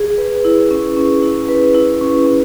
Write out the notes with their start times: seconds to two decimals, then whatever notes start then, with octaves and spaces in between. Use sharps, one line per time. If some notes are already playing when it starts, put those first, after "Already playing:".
Already playing: G#4
0.18 B4
0.45 E4
0.71 C#4
0.97 C#4
1.23 E4
1.49 B4
1.75 E4
2.01 C#4
2.26 C#4